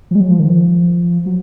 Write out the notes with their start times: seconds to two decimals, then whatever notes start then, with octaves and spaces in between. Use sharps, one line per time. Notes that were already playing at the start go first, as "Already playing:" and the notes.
0.11 F3
0.15 G#3
0.20 F#3
0.30 F3
0.39 D#3
0.49 F3
1.26 F#3